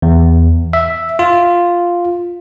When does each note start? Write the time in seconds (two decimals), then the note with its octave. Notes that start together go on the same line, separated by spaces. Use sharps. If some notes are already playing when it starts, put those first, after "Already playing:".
0.02 E2
0.73 E5
1.19 F4